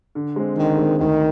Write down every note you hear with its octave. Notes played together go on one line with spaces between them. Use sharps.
D3
G#3 C4
D3 D#3
G#3 C4
D2 D#3